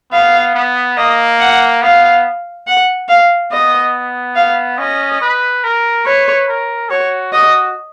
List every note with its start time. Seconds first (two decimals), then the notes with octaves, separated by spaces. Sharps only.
0.12 B3 F5
0.55 B3
0.97 A#3 D#5
1.39 F#5
1.82 B3 F5
2.67 F#5
3.09 F5
3.52 B3 D#5
4.36 F5
4.78 C#4 D#5
5.21 B4
5.64 A#4
6.05 B4 C#5
6.48 A#4
6.90 F#4 C#5
7.32 F#4 D#5